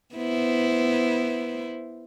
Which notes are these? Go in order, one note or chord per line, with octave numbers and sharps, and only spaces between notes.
B3 E4 C5